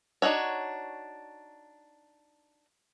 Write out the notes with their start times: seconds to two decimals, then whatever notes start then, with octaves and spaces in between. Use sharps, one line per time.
0.22 D4 D#4 F#4 C#5